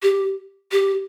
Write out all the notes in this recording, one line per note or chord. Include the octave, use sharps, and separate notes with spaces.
G4
G4